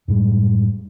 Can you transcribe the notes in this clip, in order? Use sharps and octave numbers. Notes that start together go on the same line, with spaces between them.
F#2 A2 G3 G#3